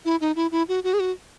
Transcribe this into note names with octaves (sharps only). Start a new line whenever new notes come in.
E4
D#4
E4
E4
F#4
F#4
G#4
F#4